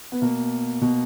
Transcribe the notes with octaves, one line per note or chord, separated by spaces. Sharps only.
B3
B2 A#3
B2